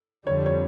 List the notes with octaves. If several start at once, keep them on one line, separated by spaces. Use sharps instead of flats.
F2 D3 G3 C#5
C#5